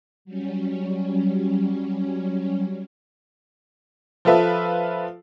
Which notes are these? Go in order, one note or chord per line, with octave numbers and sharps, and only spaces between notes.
F#3 G3 C#4
F3 F4 A4 B4 E5